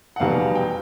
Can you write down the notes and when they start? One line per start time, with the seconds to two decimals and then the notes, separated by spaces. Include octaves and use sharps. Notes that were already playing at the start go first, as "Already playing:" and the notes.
0.16 F#5
0.20 F1 E2 B2 G3 B3 F5
0.55 G5